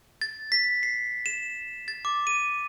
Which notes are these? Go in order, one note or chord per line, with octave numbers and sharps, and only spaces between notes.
A6
B6
C7
E7
A6
D6
D#7